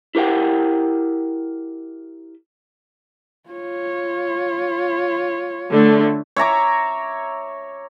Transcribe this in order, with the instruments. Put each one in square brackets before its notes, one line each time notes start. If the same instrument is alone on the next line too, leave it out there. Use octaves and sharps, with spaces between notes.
[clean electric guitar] E4 G4 A#4 F#5 G5
[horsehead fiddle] F4 C#5
[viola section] D3 A3
[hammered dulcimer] C#5 E5 A#5 D6